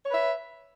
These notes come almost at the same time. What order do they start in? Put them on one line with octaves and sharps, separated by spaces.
C#5 B4 E5